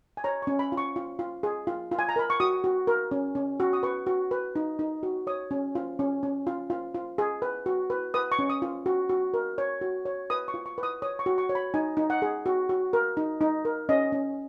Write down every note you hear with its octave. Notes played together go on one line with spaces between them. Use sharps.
G#5
C#5 A#5
C#4 C#6
B5
F4
C#6
F4
F4
G#4
F4
F4
G#5
A#5
A#4 B5
C#6
F#4 D#6
F#4
A#4
C#4
C#4
F#4
D#6
B4 C#6
F#4
B4
D#4
D#4
F#4
C#5 D#6
C#4
F4
C#4
C#4
F4
F4
F4
G#4
B4
F#4
B4
B4 D#6
C#6
C#4
D#6
F4
F#4
F#4
A#4
C#5
F#4
C#5
B4 D#6
C#6
F4
C#6
B4
D#6
C#5 D#6
C#6
F#4
C#6
C#5
B5
D#4 G#5
D#4
F#5
G#4
F#4
F#4
A#4
D#4
D#4
A#4
C#4 D#5
C#4